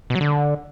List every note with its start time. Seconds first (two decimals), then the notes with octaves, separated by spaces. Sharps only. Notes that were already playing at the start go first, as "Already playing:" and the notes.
0.10 B2
0.15 F#3
0.21 D3